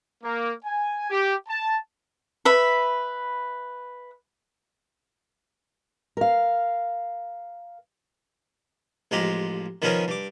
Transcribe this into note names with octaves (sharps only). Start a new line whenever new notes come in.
A#3
G#5
G4
A5
B4 E5 B5
A#4 F5
A1 F3 G#3 G4 A#5
D#3 F3 B3 C#4 G#4 A#4
G2 D6